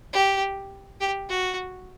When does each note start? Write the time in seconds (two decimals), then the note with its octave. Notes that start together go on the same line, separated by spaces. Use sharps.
0.13 G4
1.00 G4
1.29 F#4